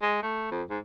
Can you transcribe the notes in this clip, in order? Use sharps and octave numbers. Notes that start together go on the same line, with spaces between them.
G#3
A3
F2
G#2